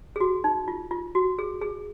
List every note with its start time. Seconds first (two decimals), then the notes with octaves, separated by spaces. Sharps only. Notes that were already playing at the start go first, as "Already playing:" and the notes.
0.16 G#4
0.20 F#4
0.44 D#4
0.68 F4
0.91 F4
1.15 F#4
1.39 G#4
1.62 G#4